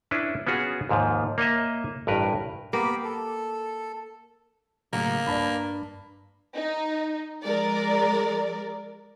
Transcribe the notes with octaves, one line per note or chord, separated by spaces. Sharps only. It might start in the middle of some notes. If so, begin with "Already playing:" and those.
C#4 D4 E4 B4
B3 C#4 F4 F#4 G#4
D#2 G#2 F3
A#3 C#5 D#5 E5
A1 G2 A#4 B4
A#3 B3 G4 B5
A4
A2 C#3 F#3 A#3
G2 D5 A5 B5
D#4
F3 G#3 A#4 D5